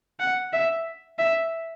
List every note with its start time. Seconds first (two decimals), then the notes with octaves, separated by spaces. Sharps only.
0.20 F#5
0.53 E5
1.19 E5